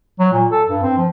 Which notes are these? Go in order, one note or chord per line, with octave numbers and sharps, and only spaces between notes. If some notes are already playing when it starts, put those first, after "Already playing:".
F#3
A#2
A4
G2
C4
F3